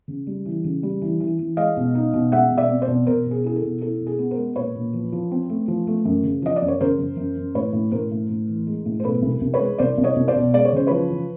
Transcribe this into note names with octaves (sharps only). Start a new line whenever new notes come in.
C#3
G3
E3
C#3
G3
E3
E3
E3
G#3 D#5 F5
B2
D#4
B2
G#3 E5 F#5
B2
D5 E5
C4
C5 D5
B2
B2 A#4 C5
B2
G#4
E4 G#4
A4
B2
E4 A4
B2
G#4
B3
A#4 C5
G#3
A#2 B4 C#5
A#2
F3
F3
C4
A3
F3
A3
F#2
C#3
F3 D#5
D5
F#2
C#5
C#3 A#4 C5
F#2
F#2
F#2
A2 B4 C#5
A2
A2 A#4 C5
A2
A2
E3
G#3
A2
C5
B2 A4 B4
C2
C2
B4 C#5
G#3
C2 C5 D5
C2
C#5 D#5
C2
C5 D5
B2
G#3 D5
C#5
C#3 C5
F3 B4 C#5
F3